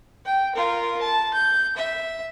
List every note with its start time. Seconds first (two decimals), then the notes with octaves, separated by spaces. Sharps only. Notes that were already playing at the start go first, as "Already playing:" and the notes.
0.25 G5
0.55 F4 A#4
1.01 A5
1.34 G6
1.77 E5